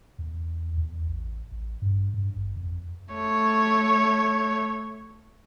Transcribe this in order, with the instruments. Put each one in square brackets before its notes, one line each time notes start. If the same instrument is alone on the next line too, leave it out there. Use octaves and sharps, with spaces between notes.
[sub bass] E2
E2
A1
A1
G2
G2
G#1
F2
[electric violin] A3 C#5